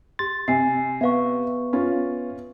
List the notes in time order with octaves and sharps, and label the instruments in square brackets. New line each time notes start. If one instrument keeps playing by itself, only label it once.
[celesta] G4 C6 [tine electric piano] A6
[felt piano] C3 [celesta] G#5 C7
[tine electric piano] B3 B4 [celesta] E5 F5 C#6
[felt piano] C#4 F4